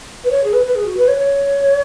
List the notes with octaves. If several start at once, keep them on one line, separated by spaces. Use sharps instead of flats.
B4
C#5
G#4
B4
B4
G#4
F#4
B4
C#5
C#5